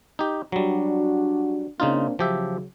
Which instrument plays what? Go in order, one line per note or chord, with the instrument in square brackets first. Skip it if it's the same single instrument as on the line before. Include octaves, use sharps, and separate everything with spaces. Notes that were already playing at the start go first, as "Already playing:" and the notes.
[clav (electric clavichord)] D#4 G4
[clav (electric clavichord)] F#3 G3 [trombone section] D4 F#4
[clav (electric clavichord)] C#3 D#4 F4 [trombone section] A#3 C4 D4
[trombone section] C#3 F#3 [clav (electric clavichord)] F3 G4 E5